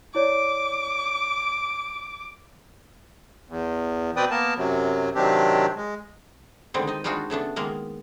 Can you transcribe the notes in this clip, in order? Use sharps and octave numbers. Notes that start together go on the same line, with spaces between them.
E4 C#5 D5 D6
E2
B2 C4 B4 D5 G5 D#6
A#3 B3 A#4 A5
F#2 C3 F#3
C3 D#3 F#3 C4 D4 G4
G#3
D3 D#3 G3 G#3 B3 C4
D#4 D#5
G3 G#3 D4 D#4 F4 F#4
C#3 A3 B3 D4
D#3 G#3 A#3 B3 A#4